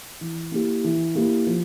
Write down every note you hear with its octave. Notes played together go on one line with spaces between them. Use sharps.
E3
A#3 E4 G4
E3
A#3 E4 G4
F3